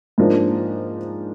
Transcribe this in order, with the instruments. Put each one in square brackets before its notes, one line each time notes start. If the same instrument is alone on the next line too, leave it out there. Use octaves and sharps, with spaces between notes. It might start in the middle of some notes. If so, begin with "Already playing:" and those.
[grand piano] G#2 F3 A#3 D4